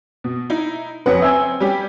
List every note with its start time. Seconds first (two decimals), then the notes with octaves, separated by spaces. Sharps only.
0.24 B2
0.50 D#4 E4
1.06 F2 F#3 C#4 B4 F#5
1.22 C4 C#4 E5 G#5
1.60 G3 C#4 G4